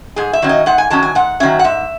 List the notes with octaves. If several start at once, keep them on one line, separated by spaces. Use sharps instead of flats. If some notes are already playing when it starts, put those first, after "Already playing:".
G#2 G#4
E5
D#3 F#3 C#4
D#5
G#2 F#5
G#5
D#3 F#3 C#4 A5
G#5
G#2 F#5
D#3 F#3 C#4 E5
F#5
G#2 E5